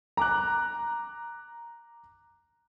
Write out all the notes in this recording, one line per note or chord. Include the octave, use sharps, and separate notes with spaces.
A#5 D6 F#6